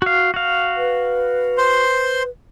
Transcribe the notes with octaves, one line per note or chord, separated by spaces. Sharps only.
F#4 F5
F#4 F5
B4
C5 C6